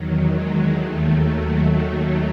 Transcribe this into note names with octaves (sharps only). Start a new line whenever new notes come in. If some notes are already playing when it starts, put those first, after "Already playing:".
Already playing: E2 D#3 F#3
G#3
D#2 D#3 A3
F#3